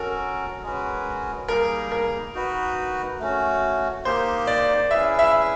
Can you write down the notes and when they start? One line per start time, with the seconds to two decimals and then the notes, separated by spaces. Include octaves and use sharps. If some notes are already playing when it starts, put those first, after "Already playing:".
Already playing: C#4 F#4 A4 A#4
0.63 G#3 C#4 F#4 B4
1.49 G3 A#3 D#4 G#4 A#4
1.92 A#4
2.34 D#4 F#4 B4
3.19 A3 C#4 F#4
4.05 A#3 D#4 G4 C5
4.47 D5
4.90 C#4 E4 G#4 B4 E5
5.19 E5